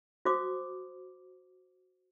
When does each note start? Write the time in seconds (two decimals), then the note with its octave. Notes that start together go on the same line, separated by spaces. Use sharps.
0.25 F#4 C5 D6 D#6